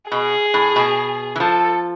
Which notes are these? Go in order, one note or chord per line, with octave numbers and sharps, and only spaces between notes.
B2 G#4
A2
B2
E3
F3 A4